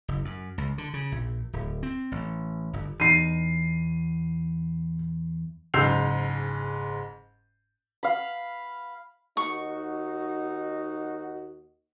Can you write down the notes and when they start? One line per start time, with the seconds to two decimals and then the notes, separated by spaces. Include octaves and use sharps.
0.08 F#1
0.25 F#2
0.58 C#2
0.78 D3
0.94 C#3
1.12 A#1
1.53 D1
1.83 C4
2.12 A1
2.73 G1
3.00 E2 D#4 C7 D#7
5.74 F#1 G#2 E6 G6 C7 F7
8.03 F5 B5
9.37 D#2 D#4 F#4 C#6